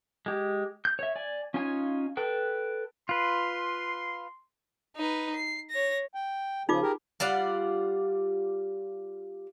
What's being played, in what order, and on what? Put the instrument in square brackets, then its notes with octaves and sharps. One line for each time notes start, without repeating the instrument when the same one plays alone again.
[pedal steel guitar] G#3 G4
G6
C#5 E5
D5 G#5
C#4 D#4 F4 C#5 G#5
A4 B4 G5
[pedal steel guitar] F4 B4 [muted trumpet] C6
[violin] D#4 B4
C7
C#5 A#6
[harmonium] G5
[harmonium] C#3 F3 G#4 [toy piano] D#4 F4 D6
[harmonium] G4 G#4 A#4
[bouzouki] G3 F4 D5 F#5